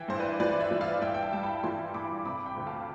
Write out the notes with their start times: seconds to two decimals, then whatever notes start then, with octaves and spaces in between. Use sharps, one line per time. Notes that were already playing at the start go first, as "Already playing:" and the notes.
Already playing: E3 E5 G5
0.08 G2 C5
0.19 B4 D5
0.40 E3 B4 D5
0.61 C5 E5
0.71 E3
0.81 D5 F5
1.02 G2 E5 G5
1.14 G5
1.22 F5 A5
1.33 G3 A5
1.43 G5 B5
1.63 E3 A5 C6
1.94 G2 B5 D6
2.25 C3 B5 D6
2.46 G5 B5
2.56 D2
2.67 F5 A5